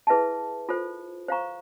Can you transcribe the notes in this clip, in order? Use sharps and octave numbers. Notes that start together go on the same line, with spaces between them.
E4 G#4 B4 E5 A5
F4 A4 C5
C5 F5 A#5 C#6